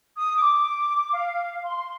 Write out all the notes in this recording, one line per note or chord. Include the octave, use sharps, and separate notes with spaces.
D#6
D6
F5
C6